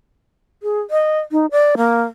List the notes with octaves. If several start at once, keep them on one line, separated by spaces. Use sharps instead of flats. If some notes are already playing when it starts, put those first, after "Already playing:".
G#4
D#5
D#4
D5
A#3